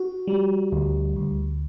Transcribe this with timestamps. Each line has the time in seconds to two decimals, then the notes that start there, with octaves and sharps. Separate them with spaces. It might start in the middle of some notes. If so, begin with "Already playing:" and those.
Already playing: F#4
0.27 G3
0.72 D2
1.16 D2